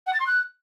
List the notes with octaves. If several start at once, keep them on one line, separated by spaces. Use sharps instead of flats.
F#5
A6
C6
F#6